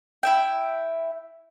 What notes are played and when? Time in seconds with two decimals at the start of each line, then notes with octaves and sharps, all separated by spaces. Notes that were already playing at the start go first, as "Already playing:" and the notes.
0.23 E4 E5 G5